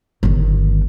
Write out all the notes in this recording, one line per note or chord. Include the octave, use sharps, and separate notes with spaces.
G1 D#3